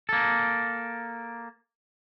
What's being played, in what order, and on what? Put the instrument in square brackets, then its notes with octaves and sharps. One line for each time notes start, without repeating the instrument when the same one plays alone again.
[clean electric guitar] A#3 A4